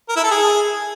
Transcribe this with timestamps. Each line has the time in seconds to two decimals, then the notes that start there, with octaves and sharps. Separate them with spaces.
0.09 A#4
0.16 E4
0.23 A4
0.31 G#4